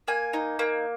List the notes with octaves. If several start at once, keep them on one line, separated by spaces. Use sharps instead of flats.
A#3 G#5
D#4
A#3